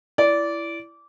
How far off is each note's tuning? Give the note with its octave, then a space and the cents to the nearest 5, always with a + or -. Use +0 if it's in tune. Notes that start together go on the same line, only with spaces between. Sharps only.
E4 +20 D5 -20